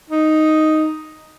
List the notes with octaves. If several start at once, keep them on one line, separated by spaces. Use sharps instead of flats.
D#4